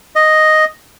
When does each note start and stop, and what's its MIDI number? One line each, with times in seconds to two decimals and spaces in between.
0.16 0.65 75